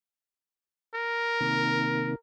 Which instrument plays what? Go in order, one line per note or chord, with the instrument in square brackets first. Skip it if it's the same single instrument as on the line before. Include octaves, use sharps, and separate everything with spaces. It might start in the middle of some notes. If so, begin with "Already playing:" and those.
[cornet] A#4
[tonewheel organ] C3 D#3 A#3